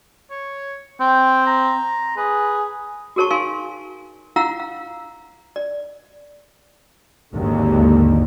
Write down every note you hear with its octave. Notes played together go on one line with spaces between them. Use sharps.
C#5
C4 G5
A#5
G#4 B4
F#4 G#4 A#4 C#5 A5 C#6
D#4 A#4 F5 G#5 C6
E4 F4 F5 F#5 A#5 E6
F5
D5
G#1 D#2 D3